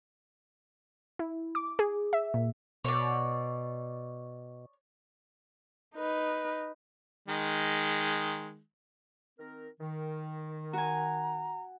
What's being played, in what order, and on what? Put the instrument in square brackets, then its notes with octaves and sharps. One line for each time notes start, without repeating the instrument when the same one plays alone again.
[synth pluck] E4
D6
G#4
E5
A#2
[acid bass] B2 [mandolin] C#5 D5
[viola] D#4 B4
[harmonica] D#3 G#3
[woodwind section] D#3 C4 A#4
D#3
[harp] F#4 G#5 [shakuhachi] A#5